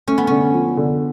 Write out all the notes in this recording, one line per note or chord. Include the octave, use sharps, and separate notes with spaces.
A3 C#4
B3
D3 C#4
F3
D3